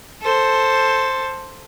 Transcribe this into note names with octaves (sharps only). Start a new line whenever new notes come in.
A4 C5